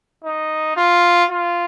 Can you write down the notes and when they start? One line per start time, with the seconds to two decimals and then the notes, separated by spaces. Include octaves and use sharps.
0.24 D#4
0.77 F4
1.30 F4